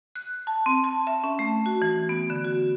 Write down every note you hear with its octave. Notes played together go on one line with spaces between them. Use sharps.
F#6
A5
C4
A5
E5
C#4
A3
F#4
E3
B3
D3
F#4